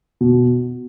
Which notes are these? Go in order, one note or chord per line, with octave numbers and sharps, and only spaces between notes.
B2